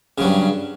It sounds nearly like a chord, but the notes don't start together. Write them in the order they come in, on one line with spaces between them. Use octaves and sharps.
C#3 F#3 G2